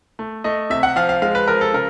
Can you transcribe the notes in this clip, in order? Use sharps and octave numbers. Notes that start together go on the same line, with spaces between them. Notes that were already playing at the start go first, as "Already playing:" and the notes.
A3
A3 D#5
C3 E5
F#5
F3 F5
F5
G#3 F5
B4
F3 A#4
A4
C#3 A#4